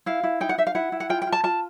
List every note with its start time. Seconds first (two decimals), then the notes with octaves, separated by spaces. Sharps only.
0.06 E4 F5
0.23 E4
0.41 D#4 G5
0.49 F#5
0.58 D#4 E5
0.67 F5
0.75 E4 F#5
0.92 E4
1.00 F#5
1.09 F4 G5
1.22 G5
1.27 F4
1.32 A5
1.43 F4 A5